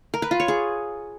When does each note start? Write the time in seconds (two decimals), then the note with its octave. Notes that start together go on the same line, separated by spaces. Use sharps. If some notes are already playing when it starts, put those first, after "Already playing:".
0.14 A#4
0.22 B4
0.31 F4
0.40 C#5
0.48 G#4